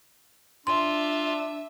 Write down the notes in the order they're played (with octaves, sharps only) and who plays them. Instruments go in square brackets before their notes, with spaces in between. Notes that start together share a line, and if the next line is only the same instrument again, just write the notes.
[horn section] D4 [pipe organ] F4 [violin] E5 [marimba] C6